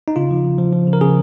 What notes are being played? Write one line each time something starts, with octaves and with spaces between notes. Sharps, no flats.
D#4
C#3 F4
F3
C#3
F3
F3
C#3
A#4
C#3 G#4